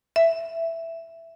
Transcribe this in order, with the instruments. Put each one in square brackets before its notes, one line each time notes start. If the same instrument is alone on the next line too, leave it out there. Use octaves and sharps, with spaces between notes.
[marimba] E5